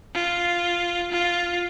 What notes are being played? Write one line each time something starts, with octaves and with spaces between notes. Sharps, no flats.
F4
F4